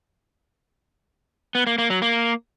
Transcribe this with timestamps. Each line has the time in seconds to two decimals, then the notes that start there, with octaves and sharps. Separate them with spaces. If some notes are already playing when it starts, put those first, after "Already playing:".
1.55 B3
1.67 A#3
1.78 A#3
1.90 F#3
2.02 A#3